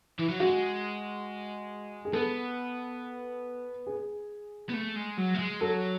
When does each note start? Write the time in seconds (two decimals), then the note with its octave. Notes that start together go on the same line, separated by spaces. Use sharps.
0.19 E3
0.30 F#3
0.40 G#3 F#4
2.05 G#4
2.13 B3 A4
3.87 G#4
4.69 B3
4.73 A3
4.95 G#3
5.17 F#3
5.34 A3
5.39 G#3
5.60 F#3 A4